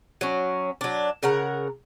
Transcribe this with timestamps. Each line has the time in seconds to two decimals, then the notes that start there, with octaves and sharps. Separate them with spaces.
0.21 F#3 C#4
0.81 F#3 D4
1.23 C#3 A#4 F#5 A#5